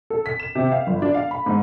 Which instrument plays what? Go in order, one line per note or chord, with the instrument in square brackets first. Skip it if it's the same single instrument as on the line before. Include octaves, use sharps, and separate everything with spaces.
[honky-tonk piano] A4
B6
E7
C3
F5
G1
D4
F5
B5
G#2